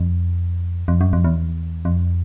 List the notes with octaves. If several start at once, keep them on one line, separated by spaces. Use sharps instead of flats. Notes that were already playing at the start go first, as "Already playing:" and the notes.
Already playing: F2
F2
F#2
F2
E2
F2